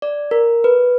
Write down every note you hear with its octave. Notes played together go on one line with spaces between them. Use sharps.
D5
A#4
B4